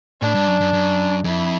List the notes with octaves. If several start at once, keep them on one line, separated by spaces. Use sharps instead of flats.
A2 D4
G2
F#2
F#2
F#2
F2 E4